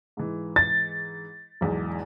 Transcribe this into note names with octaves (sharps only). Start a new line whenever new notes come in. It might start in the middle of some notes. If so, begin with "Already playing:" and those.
G#2 E3
A6
B1 E2 G#2